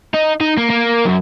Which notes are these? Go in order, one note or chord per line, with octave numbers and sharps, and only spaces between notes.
D#4
D#4
A#3
A#3
F#2